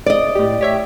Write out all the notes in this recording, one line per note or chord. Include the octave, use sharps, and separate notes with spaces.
D5 D#5
A2 G4
G4 C#5 E5